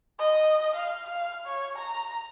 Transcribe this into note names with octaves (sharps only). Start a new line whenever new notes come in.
D#5
F5
F5
C#5
A#5